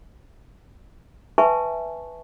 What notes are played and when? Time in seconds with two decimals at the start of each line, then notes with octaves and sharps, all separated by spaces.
1.38 B4 E5 G#5 A5 C#6